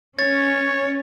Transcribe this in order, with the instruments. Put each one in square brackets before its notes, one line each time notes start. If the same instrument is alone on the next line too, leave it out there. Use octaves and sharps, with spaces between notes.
[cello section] C#4 [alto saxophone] C#5 [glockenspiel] A6